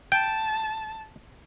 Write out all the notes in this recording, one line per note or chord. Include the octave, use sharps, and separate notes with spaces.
G5 A5